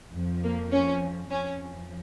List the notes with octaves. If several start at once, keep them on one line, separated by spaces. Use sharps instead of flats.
F2 F3
A#3
C#4
F2 F3 C#4